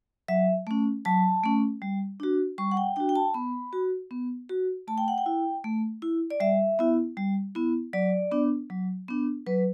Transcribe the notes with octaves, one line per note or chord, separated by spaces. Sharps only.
F#3 E5
A3 C#4
F#3 A5
A3 C#4
G3
D4 F#4
G3 C#6
F#5
G5
D4 F#4 G5
G5
A5
B3 B5
F#4
B3
F#4
A3 A5
G5
F#5
G5
E4
A3
E4
D5
G3 E5
B3 E4
G3
B3 E4
F#3 D5
B3 D4
F#3
B3 D4
F#3 B4